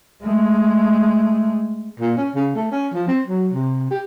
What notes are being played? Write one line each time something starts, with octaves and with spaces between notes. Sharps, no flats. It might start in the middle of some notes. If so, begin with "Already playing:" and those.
G#3 A3
A#2
C#4
C#3
A3
C#4
F3
C4
F#3
C3
G4